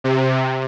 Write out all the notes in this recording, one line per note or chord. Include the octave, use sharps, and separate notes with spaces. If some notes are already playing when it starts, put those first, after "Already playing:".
C3